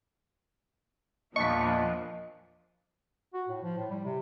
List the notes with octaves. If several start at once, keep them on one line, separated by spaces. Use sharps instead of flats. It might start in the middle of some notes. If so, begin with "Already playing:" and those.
E2 A#2 F3 A#3 D4 D#5 C#6 B6
F#4
A2
F3
A2
G3
C3